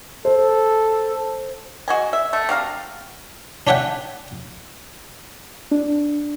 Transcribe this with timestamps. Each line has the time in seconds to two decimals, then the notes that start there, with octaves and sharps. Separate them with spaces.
0.25 A4 C5
1.88 G#3 F#4 D#5 G#5
2.13 E5
2.33 A3
2.49 C3 F#4 F5 A#5
3.67 C#4 D4 C#5 E5 F#5 G5
5.71 D4